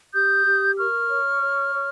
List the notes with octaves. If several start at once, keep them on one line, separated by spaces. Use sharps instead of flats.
G4 D#6 G6
G4
A#4 C#6 F6
C#5
C#5
C#5